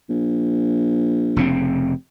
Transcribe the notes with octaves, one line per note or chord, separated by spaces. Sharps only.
A#1
F1 C#3 C4